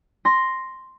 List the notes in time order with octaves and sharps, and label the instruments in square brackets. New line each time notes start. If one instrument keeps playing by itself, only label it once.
[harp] C6 A#6